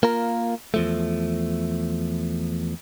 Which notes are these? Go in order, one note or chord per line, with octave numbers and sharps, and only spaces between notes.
A#3 F4 A#4
E2 F3 A3